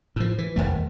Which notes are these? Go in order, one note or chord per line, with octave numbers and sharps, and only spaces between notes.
A2 F3
E3
D#1 G#1 D#2 A3